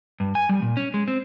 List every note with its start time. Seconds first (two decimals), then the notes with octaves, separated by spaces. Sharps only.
0.20 G2
0.35 G#5
0.49 G3
0.62 A#2
0.77 C#4
0.94 G#3
1.08 C4